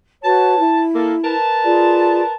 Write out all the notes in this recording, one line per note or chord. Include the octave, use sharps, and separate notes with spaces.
F#4 B4 C#5 A5
E4
A#3 A4
A#4 B4 A5
F4 G#4 D5